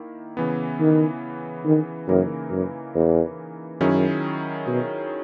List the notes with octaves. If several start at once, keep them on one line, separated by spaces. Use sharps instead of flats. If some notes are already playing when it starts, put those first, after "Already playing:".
Already playing: D#3 A#3 E4
C#3 E3 B3
D#3
D#3
F#2 C#3 E3 A#3 D#4 A#4
F#2
E2
F#2 D#3 F#3 C#4 E4 G#4
B2